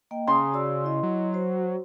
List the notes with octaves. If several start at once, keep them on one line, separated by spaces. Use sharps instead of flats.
A#3 D#5 G5
C#3 G#5 A#5 C6 D#6
F#4 D5 E6
E4 D#5
F#3
F#4 C5